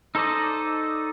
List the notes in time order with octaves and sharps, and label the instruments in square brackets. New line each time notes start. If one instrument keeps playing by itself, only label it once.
[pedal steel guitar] D#4 A4 C5 D5 D#5